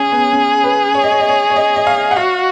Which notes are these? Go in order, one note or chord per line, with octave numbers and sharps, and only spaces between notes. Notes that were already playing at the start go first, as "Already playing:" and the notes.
Already playing: C#4 G#4
B3
C#4
B4
C#5
D#5
C#5
D#5
C#5
C#5
D#5
D#5
F5
F#5
F#4 F5